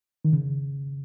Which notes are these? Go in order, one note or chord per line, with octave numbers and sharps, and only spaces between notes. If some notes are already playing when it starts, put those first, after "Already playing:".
D#3
C#3